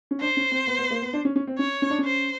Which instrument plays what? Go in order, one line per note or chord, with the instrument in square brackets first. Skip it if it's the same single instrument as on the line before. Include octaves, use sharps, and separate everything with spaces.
[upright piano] C#4
[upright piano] D4 [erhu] C5
[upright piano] C#4
C4
B3
B3
A#3
B3
D4
C#4
C#4
C4
[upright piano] C#4 [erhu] C#5
[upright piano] C#4
D4
C#4
[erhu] C5